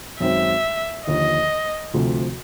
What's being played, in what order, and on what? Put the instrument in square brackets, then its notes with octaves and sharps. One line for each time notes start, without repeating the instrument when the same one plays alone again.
[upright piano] F#2 D#3 G#3 C4 [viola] E5
[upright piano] D#2 D3 F3 [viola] D#5
[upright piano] D2 C3 F3 A3